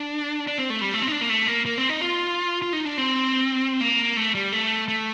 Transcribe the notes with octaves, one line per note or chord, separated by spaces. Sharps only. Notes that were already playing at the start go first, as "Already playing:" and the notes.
Already playing: D4
D4
C4
A3
G3
A3
C4
D#4
D4
A#3
A3
A#3
A#3
C4
D#4
F4
F4
D#4
D4
C4
A#3
A3
G3
A3
A3